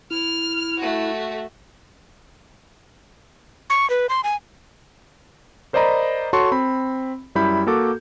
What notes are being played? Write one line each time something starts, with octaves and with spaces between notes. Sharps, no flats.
E4 F6
A3 F#4
C#6
B4
C6
G#5
A#4 C5 D5 D#5 A#5 B5
F#4 A4 C#5 A5 C6 C#6
C4 B5
F#2 G3 E4 B5 G6
A#3 F#4 A4 D6